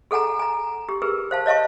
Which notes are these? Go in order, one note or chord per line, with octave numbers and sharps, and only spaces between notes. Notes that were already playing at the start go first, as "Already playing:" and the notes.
G#4 A4 F#5 G#5 A#5
G#5 A#5
G4
G4 G#4 A#4 B4
C5 F5 A5
C#5 D#5 F5 A5 C#6